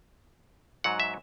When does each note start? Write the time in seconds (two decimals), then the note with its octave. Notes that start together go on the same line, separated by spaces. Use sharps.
0.84 G#2 F#3 F#5
1.00 E5